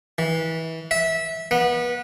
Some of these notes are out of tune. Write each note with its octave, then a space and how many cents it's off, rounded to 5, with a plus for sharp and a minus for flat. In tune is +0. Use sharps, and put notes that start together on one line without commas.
E3 -25
E5 -20
B3 -25